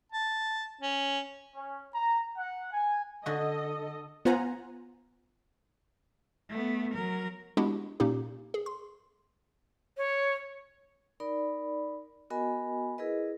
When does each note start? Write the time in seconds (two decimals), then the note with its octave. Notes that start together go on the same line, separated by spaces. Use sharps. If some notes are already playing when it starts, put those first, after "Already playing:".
0.12 A5
0.81 C#4
1.56 C#4
1.94 A#5
2.36 F#5
2.71 G#5
3.26 D3 F#4 A4 D#5
4.25 B3 F4 C5 F#5 G#5 A#5
6.50 A3 B3
6.94 F#3 A#4
7.57 G#3 B3 D4 E4 F#4 G4
8.00 A#2 A#3 C#4 D#4 G4
8.54 G#4
8.66 C6
9.97 C#5
11.20 D#4 A#4 D5 B5
12.30 B3 F#4 A#4 D#5 G#5 B5
12.98 E4 G#4 A#4 B4 D#5